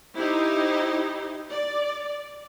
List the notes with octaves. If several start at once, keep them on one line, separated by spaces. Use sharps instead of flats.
D#4 E4 G4 C5
D5